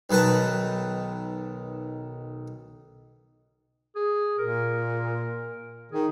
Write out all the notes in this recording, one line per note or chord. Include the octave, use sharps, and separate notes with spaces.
B1 D#3 B4 A5 A#5
G#4
A#2 A#4
D#3 G#4